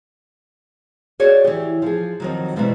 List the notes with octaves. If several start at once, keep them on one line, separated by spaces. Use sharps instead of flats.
F#4 G#4 C#5 D5
E3 G4
F3 G#4
F2 D#3 F#3
G#2 B2 E3 G3 E4